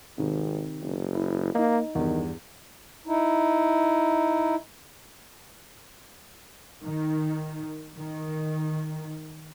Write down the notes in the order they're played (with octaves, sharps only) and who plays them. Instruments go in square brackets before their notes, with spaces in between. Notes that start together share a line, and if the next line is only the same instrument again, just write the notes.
[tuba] G#1 [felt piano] C3 D#3
[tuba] F#1
[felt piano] E4
[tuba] A#3 [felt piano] D#4 D#5
[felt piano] E2 G2 [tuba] D#3
[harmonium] D#4 E4
[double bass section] D#3
D#3